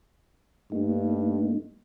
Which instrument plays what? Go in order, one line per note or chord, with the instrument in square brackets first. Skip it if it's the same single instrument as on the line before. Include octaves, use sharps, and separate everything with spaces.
[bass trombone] G2 [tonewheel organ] A3 A#3 D#4